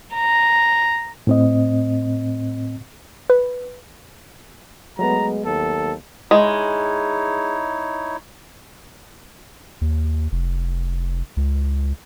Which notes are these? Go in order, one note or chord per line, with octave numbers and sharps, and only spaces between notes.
A#5
A2 C4 D#5
B4
F#3 G#3 A3 B3 A#5
D#2 A4
G#3 D#4 E4 C#5
D#2
F1
C#2